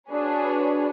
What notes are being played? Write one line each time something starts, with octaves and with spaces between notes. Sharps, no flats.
D4 F#4 G#4 B4 C#5